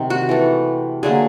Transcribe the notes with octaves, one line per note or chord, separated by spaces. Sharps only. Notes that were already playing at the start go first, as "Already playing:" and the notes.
Already playing: C3 D#3 F#3
F#4
E3 A3
D3 F#3 A#3 G#4